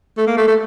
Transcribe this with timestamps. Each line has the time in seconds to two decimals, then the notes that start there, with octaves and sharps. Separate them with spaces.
0.17 A3
0.27 A#3
0.37 A3
0.48 A3